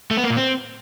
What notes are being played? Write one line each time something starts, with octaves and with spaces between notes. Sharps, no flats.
A3
B3
A#3
A#2
C4